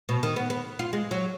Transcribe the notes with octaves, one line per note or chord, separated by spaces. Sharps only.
B2
D#3
B3
B3
F4
G#3
F#3